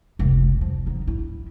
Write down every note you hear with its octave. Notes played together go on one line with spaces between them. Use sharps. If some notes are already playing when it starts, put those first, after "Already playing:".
F1 C#2
F3
B3 D#4
E4